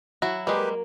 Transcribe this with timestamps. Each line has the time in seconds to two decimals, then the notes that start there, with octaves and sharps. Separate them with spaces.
0.22 F#3 E4 F#4
0.47 G3 G#3 A#3 G4 B4